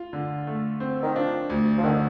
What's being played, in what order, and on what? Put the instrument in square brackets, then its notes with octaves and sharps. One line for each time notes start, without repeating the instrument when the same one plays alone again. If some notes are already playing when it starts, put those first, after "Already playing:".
Already playing: [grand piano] F4
D3
A3
C4
[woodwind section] D#3
[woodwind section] F3 [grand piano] D4
[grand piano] D2
[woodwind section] F3
[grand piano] D3 [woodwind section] D#3